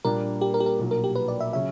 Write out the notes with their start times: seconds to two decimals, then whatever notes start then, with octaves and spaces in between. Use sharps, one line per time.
0.05 A#1 A#2 G3 A#3 D4 A#4
0.41 G4
0.54 A#4
0.60 G4
0.66 A#4
0.79 B1 A#2 F#3
0.91 A#4
1.04 G4
1.15 B4
1.28 D5
1.41 E5
1.53 C#3 F#3 C#4 E5